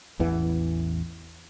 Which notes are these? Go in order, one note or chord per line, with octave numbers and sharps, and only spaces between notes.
A1 E2 E3 B3